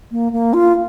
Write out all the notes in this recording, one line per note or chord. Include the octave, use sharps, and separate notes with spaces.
A#3
A#3
F4